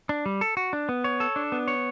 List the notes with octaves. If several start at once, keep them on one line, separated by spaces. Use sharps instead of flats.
D4
G3
A4
F#4
D4
B3
C#5
A4
D4
B3
C#5